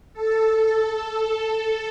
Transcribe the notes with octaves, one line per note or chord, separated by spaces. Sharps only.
A4